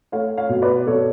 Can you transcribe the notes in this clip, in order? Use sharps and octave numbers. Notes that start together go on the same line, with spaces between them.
A3 C#5 F5
C#5 F5
B2
B4 D5
B2 A4 C#5